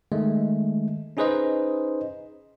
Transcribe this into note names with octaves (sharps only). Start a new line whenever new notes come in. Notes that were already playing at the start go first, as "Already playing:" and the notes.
D#3 G#3 A3
C#4 D#4 G#4 B4 C5 D#5